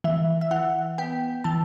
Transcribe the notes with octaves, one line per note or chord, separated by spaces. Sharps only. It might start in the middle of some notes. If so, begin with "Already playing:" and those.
E3 E5
E5
E3 F#5
B3 G5
E3 A5